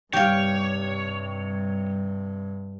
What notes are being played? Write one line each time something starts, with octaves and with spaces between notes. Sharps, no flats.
G2 C3 D#3 G3 G4 C#5 F5